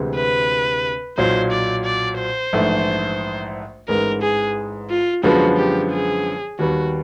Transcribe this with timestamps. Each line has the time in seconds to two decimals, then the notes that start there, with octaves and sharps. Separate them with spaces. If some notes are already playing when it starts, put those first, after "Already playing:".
Already playing: D2 C3 E3 G#3 C4
0.16 B4
1.18 B1 A#2 F#3 C5
1.52 D5
1.85 D5
2.19 C5
2.53 A#1 G#2 E3 A3
3.88 A1 G#2 E3 G#3 A#4
4.22 G#4
4.90 F4
5.23 F#2 D3 F3 G#3 B3 F#4
5.57 G4
5.92 G#4
6.59 D#2 D#3 G3 B3 F#4